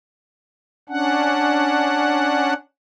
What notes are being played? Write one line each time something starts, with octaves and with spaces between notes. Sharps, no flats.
C#4 D4 F#5